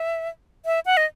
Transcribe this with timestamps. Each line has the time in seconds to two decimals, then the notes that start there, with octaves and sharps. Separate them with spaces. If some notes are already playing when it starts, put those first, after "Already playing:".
Already playing: E5
0.66 E5
0.86 F#5
0.97 D#5